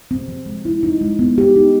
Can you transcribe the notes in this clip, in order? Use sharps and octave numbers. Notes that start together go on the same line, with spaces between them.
C4
F3
G#3
E4
D#4
G#3
B3
G4
D#4